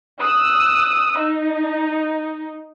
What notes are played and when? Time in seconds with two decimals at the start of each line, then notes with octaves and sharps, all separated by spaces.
0.21 D#6 E6 F#6
1.18 D#4